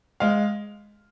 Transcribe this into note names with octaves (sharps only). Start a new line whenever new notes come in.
G#3 F5